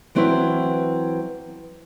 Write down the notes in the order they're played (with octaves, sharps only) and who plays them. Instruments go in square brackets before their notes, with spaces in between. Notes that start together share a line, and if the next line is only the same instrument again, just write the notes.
[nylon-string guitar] E3 F#3 C4 E4 B4 C5